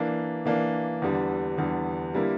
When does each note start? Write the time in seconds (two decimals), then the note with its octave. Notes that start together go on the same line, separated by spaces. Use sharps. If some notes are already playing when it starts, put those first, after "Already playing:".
Already playing: E3 A#3 D4
0.46 E3 A#3 D4
1.02 E2 D3 G3
1.58 E2 D3 G3
2.14 D3 G3 A#3 E4 A#4